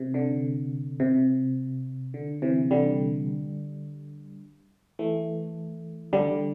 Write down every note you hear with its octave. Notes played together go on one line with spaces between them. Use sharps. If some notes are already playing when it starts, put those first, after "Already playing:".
Already playing: C3
D3
C3
D3
C3 E3
D3 G3
E3 A3
D3 G3